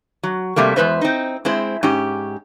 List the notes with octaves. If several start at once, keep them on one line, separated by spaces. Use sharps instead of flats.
F#3
C3 G3 A3 A#3
E2 E3 G#3 B4 C5 E5
C4 D#4
G#3 C4 E4 C5
G#2 C#4 G4